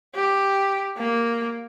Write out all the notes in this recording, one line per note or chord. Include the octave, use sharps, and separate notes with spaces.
G4
A#3